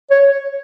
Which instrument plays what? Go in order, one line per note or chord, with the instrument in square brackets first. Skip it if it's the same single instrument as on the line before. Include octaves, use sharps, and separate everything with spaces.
[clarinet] C#5